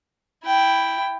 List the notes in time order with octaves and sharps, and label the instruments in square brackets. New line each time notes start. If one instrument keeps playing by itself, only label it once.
[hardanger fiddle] E4 G5